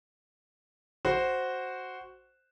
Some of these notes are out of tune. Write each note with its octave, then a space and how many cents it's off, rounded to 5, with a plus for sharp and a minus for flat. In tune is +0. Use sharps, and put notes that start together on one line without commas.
F#4 +0 C5 +0